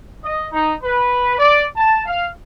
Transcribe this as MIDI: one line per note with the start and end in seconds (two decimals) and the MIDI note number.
0.24 0.46 75
0.53 0.73 63
0.84 1.37 71
1.39 1.64 74
1.76 2.01 81
2.06 2.29 77